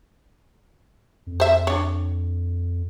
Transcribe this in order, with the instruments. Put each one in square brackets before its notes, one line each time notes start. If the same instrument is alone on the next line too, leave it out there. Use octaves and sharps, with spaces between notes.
[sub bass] F2
[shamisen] C5 E5
D4 C#5